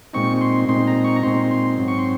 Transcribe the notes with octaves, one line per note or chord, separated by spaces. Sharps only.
A#2 G#3 C4 D#4 C#6
C6
A#2 G#3 C4 D#4 C6
A#5
C#6
A#5
A#2 G#3 C4 D#4 C6
C6
G#2 F#3 C4
C#6
C6